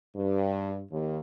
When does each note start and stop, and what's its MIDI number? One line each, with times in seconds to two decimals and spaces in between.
0.16 0.82 43
0.91 1.19 39